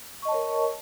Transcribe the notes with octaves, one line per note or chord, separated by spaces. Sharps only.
A#4 C#5 D#5 A5 C#6